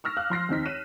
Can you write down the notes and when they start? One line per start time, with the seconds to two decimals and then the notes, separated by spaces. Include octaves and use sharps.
0.04 C#6 E6 F6 A#6
0.17 F5 D6 F6 F#6
0.30 F3 C6 A#6 C7
0.49 D#2 C4 D#4 B6
0.65 C#5 F#6 D#7 E7